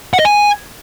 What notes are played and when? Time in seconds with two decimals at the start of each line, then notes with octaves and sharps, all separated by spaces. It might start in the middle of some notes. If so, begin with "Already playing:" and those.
0.14 F#5
0.19 D#5
0.25 G#5